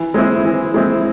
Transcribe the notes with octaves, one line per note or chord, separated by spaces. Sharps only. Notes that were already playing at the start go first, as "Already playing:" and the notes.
Already playing: E3
G#3 C4 E4
E3
G#3 C4 E4